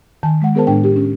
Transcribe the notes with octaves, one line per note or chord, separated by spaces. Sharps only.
D#3 G#5 A5
G#3 F#5
B3 G#4 A#4 C5 A5
A2 G#3 D4 G5
G4
C#4